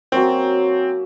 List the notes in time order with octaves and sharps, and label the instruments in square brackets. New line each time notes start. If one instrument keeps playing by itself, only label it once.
[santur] F#3 A#3 C#4 [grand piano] C4